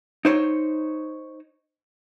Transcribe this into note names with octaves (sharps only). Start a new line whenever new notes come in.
D#4 C5 C#5